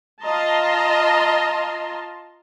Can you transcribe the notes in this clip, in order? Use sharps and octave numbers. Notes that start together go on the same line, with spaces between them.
F4 D#5 A5 A#5 C6